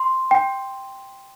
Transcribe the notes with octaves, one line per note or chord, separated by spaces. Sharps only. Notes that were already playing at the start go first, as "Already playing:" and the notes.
Already playing: C6
G5